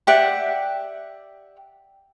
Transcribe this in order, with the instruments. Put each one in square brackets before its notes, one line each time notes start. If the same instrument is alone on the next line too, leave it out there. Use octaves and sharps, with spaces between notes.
[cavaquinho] G4 D5 E5 F#5